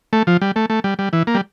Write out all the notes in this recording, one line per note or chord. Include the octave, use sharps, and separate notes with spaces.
A3
F3
G3
A3
A3
G3
G3
E3
A#3
G3